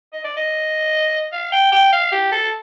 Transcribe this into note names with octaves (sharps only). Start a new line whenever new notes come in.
D#5
D5
D#5
F5
G5
G5
F5
G4
A4